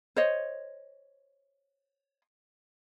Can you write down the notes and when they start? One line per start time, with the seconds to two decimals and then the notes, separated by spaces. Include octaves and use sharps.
0.16 C5 C#5 D#5